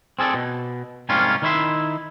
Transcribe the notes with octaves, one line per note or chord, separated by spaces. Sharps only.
C4 G#4 A4 D5
B2
G#2 C3 G3 A#3 C#4 F4
D#3 D#4 E4 C#5 E5 C6